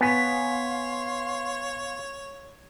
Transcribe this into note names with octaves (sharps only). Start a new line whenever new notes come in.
B3 C#5 F5 G#5 C6 B6